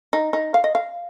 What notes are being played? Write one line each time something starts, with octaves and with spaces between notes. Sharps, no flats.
D#4
D#4
F5
D#5
F5